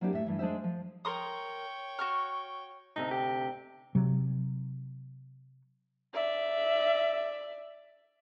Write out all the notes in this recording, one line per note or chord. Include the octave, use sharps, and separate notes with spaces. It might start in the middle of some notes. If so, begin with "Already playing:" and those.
F#3 A#3 C4 D4 E4 G4
A2 E5
G2 E3
G#3 D4 G#4 C5 E5
F3
A#4 C#5 G5 C6 D#6
F#4 C#6 F6
D2 C3 D#4
G4
C3 F#3
D5 E5